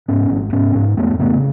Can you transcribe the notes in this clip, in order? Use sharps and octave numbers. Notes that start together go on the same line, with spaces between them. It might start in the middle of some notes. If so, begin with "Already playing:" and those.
G#2 B3 C#4
G#1
G#2 B3 C#4
G#2
F2 A3 B3
C#3 A3 B3